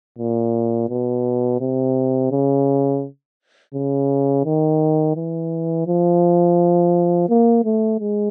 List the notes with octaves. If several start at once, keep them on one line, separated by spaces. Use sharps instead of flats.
A#2
B2
C3
C#3
C#3
D#3
E3
F3
A#3
A3
G#3